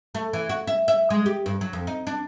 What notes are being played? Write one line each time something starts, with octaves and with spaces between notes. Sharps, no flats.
A3
E3
F#4
E5
E5
G#3
G4
G2
F#3
F2
D#4
D4